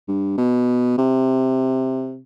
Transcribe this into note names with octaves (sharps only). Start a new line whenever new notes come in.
G2
B2
C3